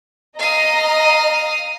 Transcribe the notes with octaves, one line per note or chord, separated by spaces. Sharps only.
D#5 F5 A#5 D#6